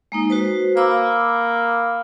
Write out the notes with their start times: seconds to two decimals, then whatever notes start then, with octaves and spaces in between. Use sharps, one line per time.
0.12 G#3 A#3 D#4
0.30 F#4 B4 C5
0.77 A#3 B5 D6 E6